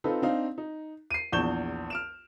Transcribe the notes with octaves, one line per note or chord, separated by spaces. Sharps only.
C4 D#4 F4 A4 B4
C4 D4 D#4 F5
D#4
C7 D#7
A#1 E2 C#6 G6 E7 G7
F6 D7 E7